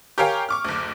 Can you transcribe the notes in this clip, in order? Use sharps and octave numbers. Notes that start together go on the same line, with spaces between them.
G4 A#4 C#5 F5 G5 G#5
C#6 D6 F6
F#1 D2